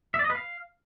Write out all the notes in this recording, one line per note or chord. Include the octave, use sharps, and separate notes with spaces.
E5
D5
D#5
B4
F5